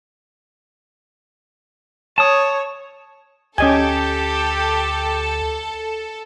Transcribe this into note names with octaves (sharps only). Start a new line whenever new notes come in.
C#5 A5 D#6
D2 C#4 G4 A4 D#5 G#5